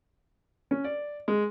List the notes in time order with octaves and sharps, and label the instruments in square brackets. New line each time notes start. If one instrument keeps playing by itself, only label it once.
[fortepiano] C#4
D5
G#3